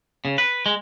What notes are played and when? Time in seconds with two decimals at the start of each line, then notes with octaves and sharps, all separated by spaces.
0.25 C#3
0.38 B4
0.66 G#3